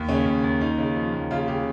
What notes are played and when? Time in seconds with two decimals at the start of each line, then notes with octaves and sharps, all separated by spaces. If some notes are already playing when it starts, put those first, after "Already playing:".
Already playing: D#2
0.09 C#3 C#4
0.26 D#2
0.44 D#2
0.61 D#2 D#4
0.78 C#3
0.96 F3
1.14 D#2
1.31 C#3 F4
1.48 C#3 G4